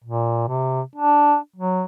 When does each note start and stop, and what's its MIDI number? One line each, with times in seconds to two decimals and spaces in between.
0.04 0.45 46
0.48 0.81 48
0.95 1.36 62
1.56 1.84 54